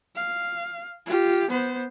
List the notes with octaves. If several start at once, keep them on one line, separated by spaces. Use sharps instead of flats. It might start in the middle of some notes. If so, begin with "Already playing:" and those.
F5
F4 G4
B3 C5